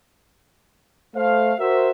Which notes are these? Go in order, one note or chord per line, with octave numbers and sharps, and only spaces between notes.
A3 C5 F5
F#4 A#4 C5 E5